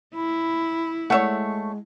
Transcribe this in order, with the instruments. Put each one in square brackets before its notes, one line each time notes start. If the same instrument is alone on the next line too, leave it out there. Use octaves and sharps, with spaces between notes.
[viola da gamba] E4 [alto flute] B5
[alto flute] G#3 [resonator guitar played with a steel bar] A3 C#5 [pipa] E5 F#5